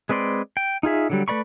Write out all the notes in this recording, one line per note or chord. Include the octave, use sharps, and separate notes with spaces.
G#3 C4 B4 D5 C6
G5
D#4 F4 G#4 E5
D3 F#3 G3
A3 B4 D5 B5 C#6